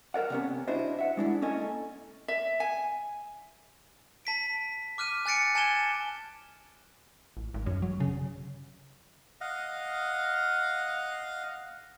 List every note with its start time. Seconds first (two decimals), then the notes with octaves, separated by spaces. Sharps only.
0.14 A4 A#4 D5 F#5
0.30 C3 B3 C#4
0.67 D4 E4 F#4 C5 D#5
0.99 E5 F#5
1.17 G#3 D4 E4
1.42 A#3 C#4 A4 D#5 G#5
2.28 E5
2.60 G#5
4.25 A5 B6 D7
4.98 D6 F6 F#6 D#7
5.26 G#5 F#6 A6 C#7 D7
5.55 G#5 A5 G#6 A6 E7 G7
7.37 A1
7.54 G#1
7.66 F#2
7.82 F#3
8.00 C#3
9.41 D#5 F5 F#5